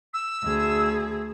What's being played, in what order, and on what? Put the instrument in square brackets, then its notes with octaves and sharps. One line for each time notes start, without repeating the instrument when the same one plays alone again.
[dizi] E6
[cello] D2 G#4